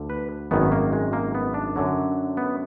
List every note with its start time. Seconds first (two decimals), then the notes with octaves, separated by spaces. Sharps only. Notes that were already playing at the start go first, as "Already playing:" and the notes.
Already playing: D2 D3
0.10 B4
0.51 G#1 F#2 D#3 F#3 B3
0.72 A#3
0.93 G#3
1.13 A#3
1.35 B3
1.54 D4
1.76 F#2 D3 F#3
2.37 B3